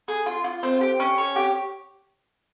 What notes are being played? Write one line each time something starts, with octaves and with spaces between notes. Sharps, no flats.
G#4
F4
F4
C4
G4
C#4
C#5
G4